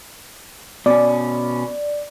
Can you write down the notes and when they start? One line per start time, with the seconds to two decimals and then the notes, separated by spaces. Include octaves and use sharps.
0.86 B2 C#4 D5